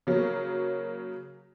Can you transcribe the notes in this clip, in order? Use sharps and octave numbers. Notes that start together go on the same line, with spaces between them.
C#3 F#3 A#3